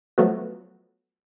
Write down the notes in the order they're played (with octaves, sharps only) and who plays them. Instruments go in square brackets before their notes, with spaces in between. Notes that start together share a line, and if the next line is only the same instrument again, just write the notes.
[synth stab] F3 F#3 A3 B3 F#4